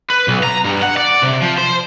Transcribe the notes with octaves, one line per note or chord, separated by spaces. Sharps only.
B4
B1
A#5
G2
F#5
D5
C3
F3
C5